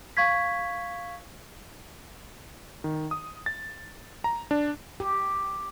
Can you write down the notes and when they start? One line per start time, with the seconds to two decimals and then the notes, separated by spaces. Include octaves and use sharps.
0.17 F5 C#6 G#6 B6
2.84 D#3
3.11 D#6
3.46 A6
4.24 A#5
4.51 D4
5.00 G4